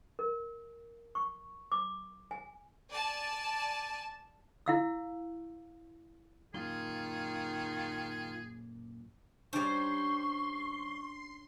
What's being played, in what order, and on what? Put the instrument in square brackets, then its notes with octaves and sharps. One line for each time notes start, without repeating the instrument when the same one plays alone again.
[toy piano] A#4
C#6
D6
G#5
[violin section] D5 G#5 A5
[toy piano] E4 F5 E6
[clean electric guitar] F#2 A#2 C6 [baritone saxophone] D#3 [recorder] F4 [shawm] G#4
[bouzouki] G3 C5 [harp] C#4 D4 G4 [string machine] C6 [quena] C#6